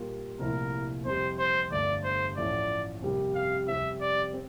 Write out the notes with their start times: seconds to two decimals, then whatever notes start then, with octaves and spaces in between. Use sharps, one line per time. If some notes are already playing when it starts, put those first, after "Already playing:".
Already playing: A#2 G3 A#3 F4
0.39 C2 A#2 F3 A3 E4 A#4
1.05 F2 C3 G3 C5
1.38 C5
1.71 G1 G2 D3 A3 D5
2.04 C5
2.37 A1 A2 F3 A3 D5
3.02 F2 C3 G3 A#3
3.35 F5
3.67 F2 C3 G3 C4 E5
4.01 D5
4.34 C4